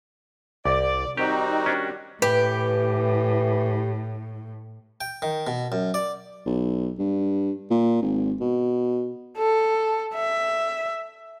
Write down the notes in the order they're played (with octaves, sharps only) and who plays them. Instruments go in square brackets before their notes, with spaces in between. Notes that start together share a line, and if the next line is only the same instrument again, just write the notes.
[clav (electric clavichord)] C2 [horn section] D5
[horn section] D#3 G3 F#4 [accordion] C4 D#4 [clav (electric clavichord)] G4
[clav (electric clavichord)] C#4 D4
[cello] A2 [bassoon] E3 [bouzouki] G4 [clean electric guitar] B4
[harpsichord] G5
D#3
B2
F#2
D5
[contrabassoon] B1
G2
A#2
G#1
B2
[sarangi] A4
E5